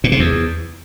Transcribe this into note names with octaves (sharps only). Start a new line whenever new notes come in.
A#2
C3
E2